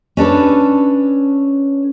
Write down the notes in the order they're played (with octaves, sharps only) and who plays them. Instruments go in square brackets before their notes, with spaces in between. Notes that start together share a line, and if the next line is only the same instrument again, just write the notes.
[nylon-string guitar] C#4 D4 A4 B4